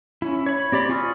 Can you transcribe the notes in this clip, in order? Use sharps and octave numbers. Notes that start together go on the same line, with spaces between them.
C#4 E4
C#5 B5
C4 G4 D5 B5
F4 G#5 C#6 D#6 F6